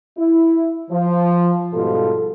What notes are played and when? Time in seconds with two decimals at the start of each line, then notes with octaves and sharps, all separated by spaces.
0.18 E4
0.91 F3
1.74 G#2 B2 G3 F4 A4